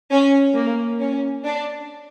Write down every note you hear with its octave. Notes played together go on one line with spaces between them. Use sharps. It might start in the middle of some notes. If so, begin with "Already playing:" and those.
C#4
A#3
C#4
D4